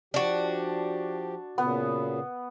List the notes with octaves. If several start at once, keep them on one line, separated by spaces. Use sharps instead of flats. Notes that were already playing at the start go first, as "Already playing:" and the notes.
F3 D4 F#4 G4
A#2 C#3 B3